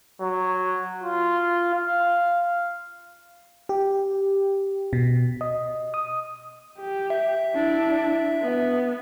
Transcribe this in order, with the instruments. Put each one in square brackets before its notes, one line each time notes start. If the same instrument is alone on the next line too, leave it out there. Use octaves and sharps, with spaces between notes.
[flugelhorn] F#3
F4
F5
[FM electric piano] G4
B2
D#5
D#6
[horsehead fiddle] G4
[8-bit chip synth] E5
[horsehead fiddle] D4 E4
B3